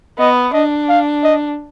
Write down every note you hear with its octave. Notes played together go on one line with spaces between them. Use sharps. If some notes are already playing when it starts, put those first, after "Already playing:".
B3 D#5
D4 D#5
F5
D#5